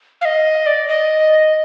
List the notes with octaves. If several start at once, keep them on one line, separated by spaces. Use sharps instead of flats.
F5
D#5
D5
D#5